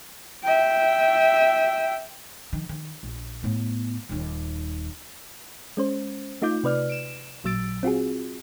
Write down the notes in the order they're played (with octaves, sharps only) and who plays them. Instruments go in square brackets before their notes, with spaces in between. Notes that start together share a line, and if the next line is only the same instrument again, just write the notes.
[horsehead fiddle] E5 G5
[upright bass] D#3 F3
D#3
A#1
A2 B3
D#1 D#2
[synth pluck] G#3 C#4 C5
A3 D#4 F4 D6 G6
C3 B4 D5 F6
D7 E7
A1 A#2 F#3 E6 A6 D7
C4 F4 F#4 G#4